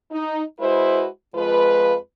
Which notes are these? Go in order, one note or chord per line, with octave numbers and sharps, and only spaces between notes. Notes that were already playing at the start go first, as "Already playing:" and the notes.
D#4
G#3 E4 F#4 B4 C5
F2 F3 G#3 F4 B4